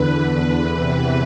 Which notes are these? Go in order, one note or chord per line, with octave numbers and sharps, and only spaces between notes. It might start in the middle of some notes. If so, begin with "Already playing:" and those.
Already playing: E2 D3 B4
B4
E2 C3 E3